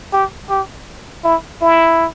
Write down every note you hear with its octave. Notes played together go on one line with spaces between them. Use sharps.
G4
G4
E4
E4